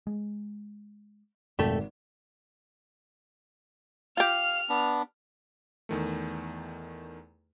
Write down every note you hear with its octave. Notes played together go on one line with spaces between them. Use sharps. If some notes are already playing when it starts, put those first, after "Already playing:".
G#3
G#1 F2 B2 A3 G4 A4
F4 G4 F5 F6
B3 D4
E2 D#3 A3